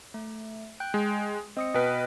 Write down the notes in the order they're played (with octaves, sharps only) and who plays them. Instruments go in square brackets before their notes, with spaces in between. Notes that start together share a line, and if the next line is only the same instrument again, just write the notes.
[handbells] A3
G5 F#6 G6
[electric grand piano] G#3
[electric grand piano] C4 [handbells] D#5 D#6 C#7
[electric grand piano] B2 B4 [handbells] D#5 G5 F6